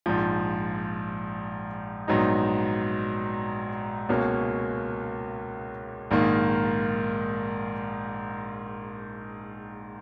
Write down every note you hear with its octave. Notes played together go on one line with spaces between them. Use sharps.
A#1 G#2 F3
A#1 G#2 F#3 B3 D#4
C#2 B2 A#3 C#4
A#1 G#2 D#3 A#3